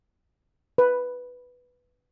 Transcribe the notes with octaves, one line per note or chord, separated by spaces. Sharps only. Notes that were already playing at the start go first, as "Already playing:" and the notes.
B4